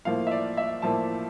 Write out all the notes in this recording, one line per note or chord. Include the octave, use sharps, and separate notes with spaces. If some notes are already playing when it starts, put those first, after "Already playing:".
A2 F3 A#3 F5
E5
D5
E5
A2 F3 A#3 A5